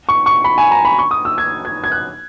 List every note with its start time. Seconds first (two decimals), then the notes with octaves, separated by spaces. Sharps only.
0.09 C#6
0.26 C#6
0.44 B5
0.58 G#5
0.71 A#5
0.85 B5
0.98 C#6
1.11 D#6
1.25 E6
1.38 G#6
1.65 G#6
1.84 G#6
1.92 F#6